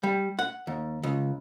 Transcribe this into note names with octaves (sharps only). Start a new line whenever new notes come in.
G3
F#5
D#2
C#2